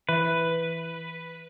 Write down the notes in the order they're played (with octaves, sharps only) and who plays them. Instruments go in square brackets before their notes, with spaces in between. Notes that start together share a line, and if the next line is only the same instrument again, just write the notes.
[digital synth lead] E3 [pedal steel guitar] B4